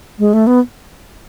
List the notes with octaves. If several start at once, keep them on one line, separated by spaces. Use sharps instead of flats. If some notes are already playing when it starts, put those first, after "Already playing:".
G#3
A3
B3